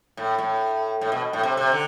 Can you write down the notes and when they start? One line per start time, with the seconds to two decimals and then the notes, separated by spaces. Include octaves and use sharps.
0.17 A2
0.39 A2
1.01 A2
1.12 B2
1.33 A2
1.43 C3
1.57 C3
1.72 D3